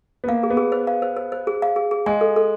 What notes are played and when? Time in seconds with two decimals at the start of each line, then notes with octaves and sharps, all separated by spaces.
0.24 B3
0.28 A#3 F5
0.43 G#4
0.50 B3
0.57 G#4
0.72 C5
0.87 F5
1.02 C5
1.17 C5
1.32 C5
1.47 G#4
1.62 F5
1.76 G#4
1.91 G#4
2.06 G#3 G#5
2.21 A4
2.36 A4